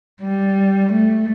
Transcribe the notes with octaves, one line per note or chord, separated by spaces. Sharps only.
G3
A3